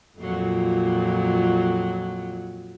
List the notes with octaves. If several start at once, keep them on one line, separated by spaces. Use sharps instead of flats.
F2 A#2 F#3